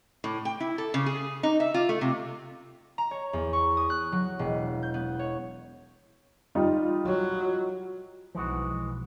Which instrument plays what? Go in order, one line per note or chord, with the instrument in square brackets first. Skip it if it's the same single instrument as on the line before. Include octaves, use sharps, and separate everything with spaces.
[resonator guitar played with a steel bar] A2
G5
E4
A4
C#3
G#4
D#4
E5
F4
A3
C3
[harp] A#5
C#5
E2
C#6
D#6
F#6
F#3
E1
G6
B3
C#5
[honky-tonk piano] G3 D#4 F4
[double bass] F#3
[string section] B1 [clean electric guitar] E3 G#3 F#4 [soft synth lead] F3